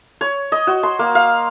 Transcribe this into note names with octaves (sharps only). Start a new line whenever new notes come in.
C#5
D#5
F#4
C6
A#3
F5